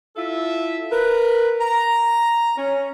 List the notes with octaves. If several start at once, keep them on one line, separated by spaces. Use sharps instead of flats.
E4 F4 A4 E5
A#4 B4
A#5
C#4